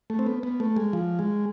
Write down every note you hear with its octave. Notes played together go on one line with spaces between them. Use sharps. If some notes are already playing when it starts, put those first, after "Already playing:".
A3
C4
B3
B3
A3
G#3
F3
G#3